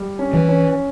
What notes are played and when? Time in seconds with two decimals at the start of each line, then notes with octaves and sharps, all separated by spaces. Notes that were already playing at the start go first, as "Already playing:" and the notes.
Already playing: G3
0.19 C#4
0.33 E3
0.49 C#4